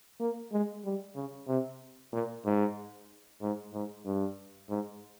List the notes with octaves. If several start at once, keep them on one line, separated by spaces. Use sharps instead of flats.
A#3
G#3
G3
C#3
C3
A#2
G#2
G#2
G#2
G2
G#2